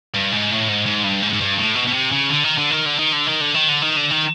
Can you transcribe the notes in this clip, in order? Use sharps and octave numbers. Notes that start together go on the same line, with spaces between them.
G2
G#2
A2
G#2
G#2
G2
G#2
G#2
G2
A2
B2
B2
C3
C#3
D3
D#3
D3
D#3
D3
D#3
D3
D#3
D3
D#3
D3
D#3
D3
D#3